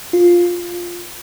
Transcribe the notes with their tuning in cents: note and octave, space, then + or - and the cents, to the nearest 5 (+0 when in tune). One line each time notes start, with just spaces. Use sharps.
F4 +5